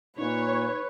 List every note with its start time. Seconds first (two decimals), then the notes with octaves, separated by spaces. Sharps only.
0.19 A#2 D#4 B4 C#5